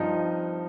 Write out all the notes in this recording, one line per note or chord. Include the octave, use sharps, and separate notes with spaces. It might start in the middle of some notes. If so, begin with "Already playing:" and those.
Already playing: G2 F3 C4 D#4